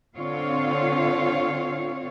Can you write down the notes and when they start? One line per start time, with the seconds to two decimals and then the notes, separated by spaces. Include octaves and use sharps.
0.16 D3 C4 F4 C#5 F5